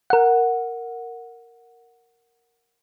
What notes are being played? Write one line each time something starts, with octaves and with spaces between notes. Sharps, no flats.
A#4 F#5